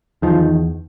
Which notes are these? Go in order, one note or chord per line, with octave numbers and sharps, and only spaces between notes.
E2 D#3 F3